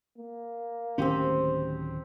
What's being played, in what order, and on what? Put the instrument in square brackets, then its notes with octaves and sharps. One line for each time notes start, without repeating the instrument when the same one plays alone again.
[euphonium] A#3
[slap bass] D1 D#3 C#4 [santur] C4 G4 C5